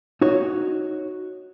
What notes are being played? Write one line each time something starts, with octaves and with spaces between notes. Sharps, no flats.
D#4 F#4 C#5